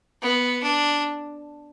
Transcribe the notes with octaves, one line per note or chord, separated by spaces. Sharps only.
B3
D4